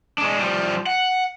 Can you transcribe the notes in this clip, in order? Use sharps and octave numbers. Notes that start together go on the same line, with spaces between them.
G#3 D4
F3 G3
F#5